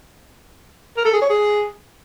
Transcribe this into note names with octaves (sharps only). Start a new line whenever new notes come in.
A#4
A4
G#4
C#5
G#4